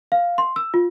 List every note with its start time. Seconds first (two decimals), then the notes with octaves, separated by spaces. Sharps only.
0.12 F5
0.38 C6
0.56 E6
0.74 F4